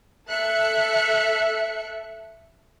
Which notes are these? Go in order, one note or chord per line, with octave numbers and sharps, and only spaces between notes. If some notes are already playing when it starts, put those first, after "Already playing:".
A4 E5 F#6 C#7